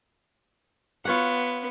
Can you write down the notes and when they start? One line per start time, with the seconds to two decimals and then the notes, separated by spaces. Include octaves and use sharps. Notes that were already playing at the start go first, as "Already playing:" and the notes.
1.05 B3 F4 C#5 F#5